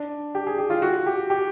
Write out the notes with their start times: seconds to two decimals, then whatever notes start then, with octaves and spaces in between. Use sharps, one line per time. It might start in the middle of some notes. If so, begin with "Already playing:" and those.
Already playing: D4
0.35 G4
0.47 G#4
0.58 G4
0.70 F4
0.82 F#4
1.06 G4
1.30 G4